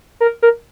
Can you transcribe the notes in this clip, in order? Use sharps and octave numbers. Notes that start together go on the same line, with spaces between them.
A#4
A#4